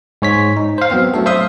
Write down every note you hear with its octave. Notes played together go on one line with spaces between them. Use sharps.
G#2 C#5 B6
D#4
C5 F5
F#3 B3 C4
F#3 A3 D4 A4
C5 E5 F5 C6 D#6